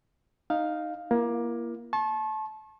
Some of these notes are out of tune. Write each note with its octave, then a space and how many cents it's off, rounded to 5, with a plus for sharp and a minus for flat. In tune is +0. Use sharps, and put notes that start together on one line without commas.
D#4 -5 F5 +5
A#3 +20 E4 +40
A5 -25 C#6 -45